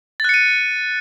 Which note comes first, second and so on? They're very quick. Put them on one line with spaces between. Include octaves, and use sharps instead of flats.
A6 F#6 C#7 D#7